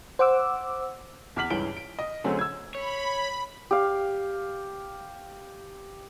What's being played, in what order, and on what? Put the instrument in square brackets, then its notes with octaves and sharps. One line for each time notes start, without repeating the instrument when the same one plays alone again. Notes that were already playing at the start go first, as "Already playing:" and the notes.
[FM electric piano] C5 F#5 D6 E6
[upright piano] E2 D6 F6 B6 F#7
C#2 G2 E3 C#4 D7 G7
D7
D#5
D3 F#3 A3 C4 C#4 G#4
E6 G#6
[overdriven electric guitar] C#5 [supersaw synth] B5
[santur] G4 F5